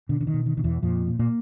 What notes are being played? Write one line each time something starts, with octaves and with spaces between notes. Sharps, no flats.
B2 D3
D3
D#3
B2
D#3
B2 D#3
E2 E3
F2 A#2 F3
A#2
A#2 A#3